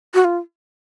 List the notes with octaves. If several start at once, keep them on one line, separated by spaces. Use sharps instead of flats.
F#4
F4